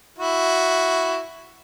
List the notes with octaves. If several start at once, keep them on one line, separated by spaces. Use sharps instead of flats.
E4 F#4